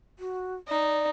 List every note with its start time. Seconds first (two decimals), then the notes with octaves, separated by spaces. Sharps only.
0.19 F#4
0.68 D#4 D5